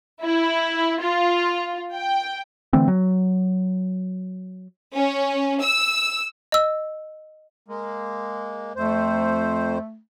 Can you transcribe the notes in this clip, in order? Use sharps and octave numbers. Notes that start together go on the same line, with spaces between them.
E4
F4
G5
D3 E3 A3 C4
F#3
C#4
E6
D#5 E6
G#3 A#3
F2 A3 C5